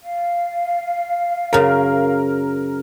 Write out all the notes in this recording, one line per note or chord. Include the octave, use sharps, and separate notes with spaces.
F5
F#2 C#3 A#4